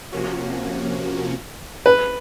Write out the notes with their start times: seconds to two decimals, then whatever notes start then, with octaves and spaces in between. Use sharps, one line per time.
0.12 C3 F3 A#3 C#4 F#4
1.86 B4